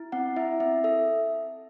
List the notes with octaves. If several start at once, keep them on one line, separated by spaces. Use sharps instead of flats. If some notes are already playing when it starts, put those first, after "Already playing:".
Already playing: E4
C4 F#5
E4 E5
C4 E5
A4 E5